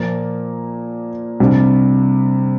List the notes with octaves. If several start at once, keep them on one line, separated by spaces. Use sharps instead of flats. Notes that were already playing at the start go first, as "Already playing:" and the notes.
Already playing: A#2 F3 A#3
C3 G3 D4